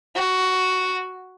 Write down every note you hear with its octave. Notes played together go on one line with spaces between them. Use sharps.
F#4